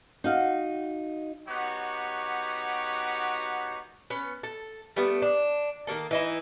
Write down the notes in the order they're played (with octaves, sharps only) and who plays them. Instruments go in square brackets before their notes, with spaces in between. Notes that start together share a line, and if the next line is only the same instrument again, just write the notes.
[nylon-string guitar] D#4 F#4 F5
[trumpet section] B3 D#4 F#4 G4 C#5 F#5
[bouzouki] B3 C#4
A4
G3 A3 B3 D4
D4
D#3 F#3 A#3 A4
E3 D#4 E4